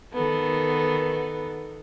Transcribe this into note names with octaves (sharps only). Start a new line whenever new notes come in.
D#3 B3 A4